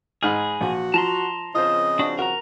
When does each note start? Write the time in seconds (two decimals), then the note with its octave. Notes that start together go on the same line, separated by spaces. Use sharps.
0.23 G#2 D#4 G#4 B5 F6
0.61 A#1 F#4
0.94 F3 A5 A#5 C6
1.55 C#3 F3 C4 F4 C5 D#5
1.99 D4 F#4
2.19 F#4 A#4 A#5